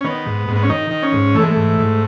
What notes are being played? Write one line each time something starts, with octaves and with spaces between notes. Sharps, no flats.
C#4
D#3 B3
G#2
G#2
B3
C#4
D#3 D#4
D#3
C#4
G#2
E3 A3
G#3
G#2 A3
G#2